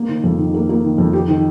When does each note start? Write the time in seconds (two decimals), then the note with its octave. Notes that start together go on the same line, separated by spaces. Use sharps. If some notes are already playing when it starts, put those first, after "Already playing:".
Already playing: A#3
0.09 D#3
0.24 F2
0.39 D#3
0.54 A#3
0.69 A#3
0.84 D#3
0.98 F2
1.13 G4
1.28 D#3